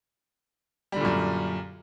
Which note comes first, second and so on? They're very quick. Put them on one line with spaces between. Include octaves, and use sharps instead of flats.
G3 D3 A#2 F#2